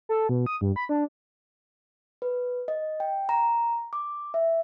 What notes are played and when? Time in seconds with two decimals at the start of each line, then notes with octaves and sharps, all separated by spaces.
0.09 A4
0.29 B2
0.46 D#6
0.61 G2
0.76 B5
0.89 D4
2.22 B4
2.68 D#5
3.00 G5
3.29 A#5
3.93 D6
4.34 E5